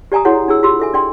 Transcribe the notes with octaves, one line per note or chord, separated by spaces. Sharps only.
G4 D5 G#5 A#5 D#6
E4 F#4 G#4 C#5 F#5
D4 G#4 E6
F4 G4 G#4 C6 E6
A4 E5 G#5
D4 D5 G5 C6